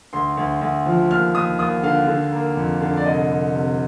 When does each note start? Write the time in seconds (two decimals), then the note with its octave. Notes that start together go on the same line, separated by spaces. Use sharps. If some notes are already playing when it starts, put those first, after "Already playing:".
0.13 D2 C6
0.37 D2
0.61 D2
0.86 F3
1.10 D#2 F6
1.35 D#2 D#6
1.59 D#2 D#6
1.83 D3 F5
2.07 D3
2.33 A#3
2.57 F2
2.81 D3
2.97 D5
3.05 C2 D#5
3.29 C2
3.54 C3